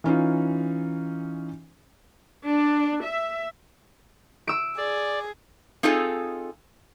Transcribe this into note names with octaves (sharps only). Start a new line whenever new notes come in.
E3 C#4 D#4 F4
D4
E5
E6 D7
G#4 D5
C4 D#4 F4 G#4 A4 G#5